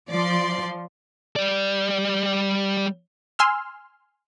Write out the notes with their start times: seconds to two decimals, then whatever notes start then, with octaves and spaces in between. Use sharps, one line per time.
0.10 F3 D5 C6
1.36 G3 D5
3.39 G#5 C6 E6 F6